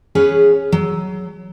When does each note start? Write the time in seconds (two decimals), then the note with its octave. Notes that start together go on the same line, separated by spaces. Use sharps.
0.15 C#4 G#4 B4 C#5 F#5
0.72 F#3